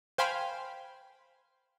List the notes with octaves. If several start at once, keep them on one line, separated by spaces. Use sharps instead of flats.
C5 F5 G5 G#5 B5 C6